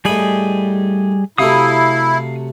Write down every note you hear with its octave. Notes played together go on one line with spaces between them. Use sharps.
A2 G3 G#4 D#5 B5
C3 F#3 A3 E4 F5 D#6